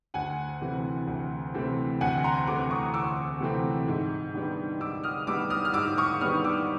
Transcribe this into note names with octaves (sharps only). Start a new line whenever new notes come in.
D2 F#5 G#5
C3 E3 A3 C4
D2
C3 E3 A3 C4
D2 F#5 G#5
A#5 C6
C3 E3 A3 C4 C6 D6
C#6 D#6
D2 D6 E6
C3 E3 A3 C4
G#2
D#3 G3 B3 D4
G#2 D6 E6
D#6 F6
D#3 G3 B3 D4 D6 E6
D#6 F6
F6
G#2 D6 E6
C#6 D#6
D#3 G3 B3 D4 D#6 F6
D6 E6